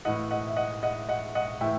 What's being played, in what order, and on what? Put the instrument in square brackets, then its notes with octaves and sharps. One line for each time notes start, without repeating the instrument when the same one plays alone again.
[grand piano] A2 E3 D#5 F#5
D#5 F#5
E5
D#5 F#5
D#5 F#5
D#5 F#5
D#5 F#5
A2 E3 E5 G5